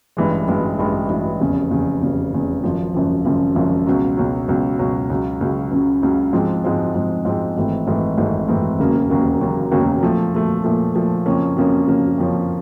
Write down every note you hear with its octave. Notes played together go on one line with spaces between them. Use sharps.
A1 G2 E3 G#3
A1 G2 E3 G#3
A1 G2 E3 G#3
A1 G2 E3 G#3
F1 E2 C#3
F1 E2 C#3
F1 E2 C#3
F1 E2 C#3
G#1 F#2 C#3 F3
G#1 F#2 C#3 F3
G#1 F#2 C#3 F3
G#1 F#2 C#3 F3
C#2 B2 F#3
C#2 B2 F#3
C#2 B2 F#3
C#2 B2 F#3
C#2 C#3 F#3
C#2 C#3 F#3
C#2 C#3 F#3
C#2 C#3 F#3
G#2 F3 G#3 C4
G#2 F3 G#3 C4
G#2 F3 G#3 C4
G#2 F3 G#3 C4
G#1 G#2 E3 A3 C4
G#1 G#2 E3 A3 C4
G#1 G#2 E3 A3 C4
G#1 G#2 E3 A3 C4
E1 D#2 C#3 F#3 A#3
E1 D#2 C#3 F#3 A#3
E1 D#2 C#3 F#3 A#3
E1 D#2 C#3 F#3 A#3
A#2 F3 A3
A#2 F3 A3
A#2 F3 A3
A#2 F3 A3
F2 C#3 F3 A#3 C#4
F2 C#3 F3 A#3 C#4
F2 C#3 F3 A#3 C#4
F2 C#3 F3 A#3 C#4